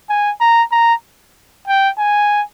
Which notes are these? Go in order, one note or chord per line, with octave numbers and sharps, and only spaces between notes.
G#5
A#5
A#5
G5
G#5